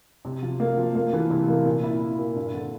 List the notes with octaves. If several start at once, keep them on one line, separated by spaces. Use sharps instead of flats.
C3
F3
A#3
F3
A#3
E3
C3
A#3
A#2
E4
E4
A#2
G2
D3